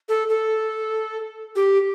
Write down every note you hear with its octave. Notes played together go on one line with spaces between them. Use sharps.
A4
A4
G4